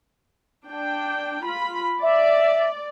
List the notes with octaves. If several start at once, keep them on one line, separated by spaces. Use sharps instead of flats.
D4 G5
F4 B5
D5 E5